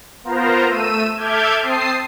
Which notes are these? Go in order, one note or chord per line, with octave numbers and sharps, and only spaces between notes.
B3 F4 A#4 C5 A#5
A3 E6 D#7
A4 E5 D6 F6 G6 G#6
C4 A5 D#6 C7